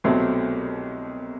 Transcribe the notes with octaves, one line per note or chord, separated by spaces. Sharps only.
C2 B2 F#3 A3 C4